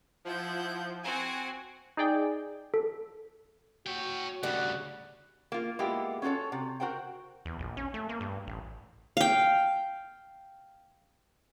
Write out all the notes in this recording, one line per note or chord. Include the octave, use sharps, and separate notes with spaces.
F3 E4 F#5 G6
C4 F#4 G#5
D#4 G#4 D5 G5
A4
F#4 C#5 G5
D2 C#3 G3 F#5
A#3 F4
G#3 A#3 B3 E4 F4 G4
C#4 F4 F#4 A4 C#5
C3
F#4 A#4 C5 F#5 G5
E2
A#1
C#4
A3
A#3
G2
A1
F5 G5